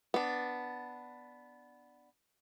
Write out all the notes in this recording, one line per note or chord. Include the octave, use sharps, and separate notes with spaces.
B3 D4